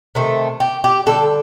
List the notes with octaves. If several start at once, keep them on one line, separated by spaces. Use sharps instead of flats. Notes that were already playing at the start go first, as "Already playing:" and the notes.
C3 D#3 A3
G4
G4
D3 G3 A4